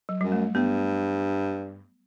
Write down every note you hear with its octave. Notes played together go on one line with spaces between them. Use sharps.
F#3
F#2 G3
A3
G2 B3